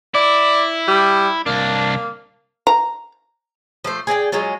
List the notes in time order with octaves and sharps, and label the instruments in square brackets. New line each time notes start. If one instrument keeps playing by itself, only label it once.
[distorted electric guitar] E4 [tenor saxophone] D5
[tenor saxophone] G3
[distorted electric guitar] C2 D4 [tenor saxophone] A#3
[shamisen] A#5
[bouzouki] F3 A3 C5
G#4 D5 D#5 G5
F#3 G#3 C#4 F4